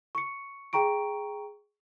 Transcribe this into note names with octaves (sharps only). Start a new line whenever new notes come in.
C#6 C#7
G#4 G5 A#5 C#6 D7